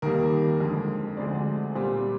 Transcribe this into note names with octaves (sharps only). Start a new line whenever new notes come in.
D#2 D#3 G3 A#3 A#4
F2 D3 G#3
D2 D3 G#3 C4 D5
A#2 G3 C4